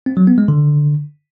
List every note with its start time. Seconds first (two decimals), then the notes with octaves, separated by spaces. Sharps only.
0.06 C4
0.17 F#3
0.27 B3
0.38 G#3
0.48 D3